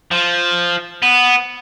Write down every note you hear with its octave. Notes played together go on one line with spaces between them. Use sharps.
F3
B3